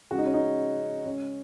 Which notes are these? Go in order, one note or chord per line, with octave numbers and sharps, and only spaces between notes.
C#3 G#3 F#4
D#4
C#4
D#4
C#3 G#3 C#4